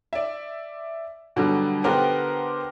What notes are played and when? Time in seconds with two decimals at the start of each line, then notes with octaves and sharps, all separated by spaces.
0.13 D5 E5
1.36 B2 D3 F#3 G3
1.84 D3 B3 D4 G4 A#4 C5